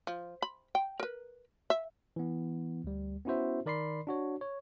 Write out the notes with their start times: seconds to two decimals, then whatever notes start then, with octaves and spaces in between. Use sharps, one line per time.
0.07 F3
0.42 B5
0.75 G5
1.00 A#4 B4
1.70 E5
2.16 E3 B3
2.84 D2 G3
3.25 B3 C#4 E4 F#4 C5 E5
3.66 D#3 A#4 D5 B5 C6 C7
4.07 D4 F#4 C#5
4.41 C#5